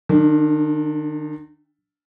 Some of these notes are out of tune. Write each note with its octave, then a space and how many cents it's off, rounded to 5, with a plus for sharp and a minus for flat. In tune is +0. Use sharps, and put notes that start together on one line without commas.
D#3 -35 D4 +0